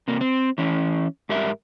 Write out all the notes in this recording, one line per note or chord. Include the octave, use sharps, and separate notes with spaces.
C3 A#3
C4
E3 C#4
G#2 G4 A#4 E5